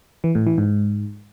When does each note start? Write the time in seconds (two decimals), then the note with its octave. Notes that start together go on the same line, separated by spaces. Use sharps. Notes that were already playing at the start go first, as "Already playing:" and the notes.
0.24 E3
0.35 A2
0.46 E3
0.58 G#2